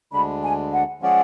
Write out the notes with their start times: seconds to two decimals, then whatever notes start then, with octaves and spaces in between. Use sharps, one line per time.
0.12 D2 D3 G#3 D4 B5
0.42 G#5
0.72 F#5
1.01 F3 G#3 C#4 G#4 D5 F#5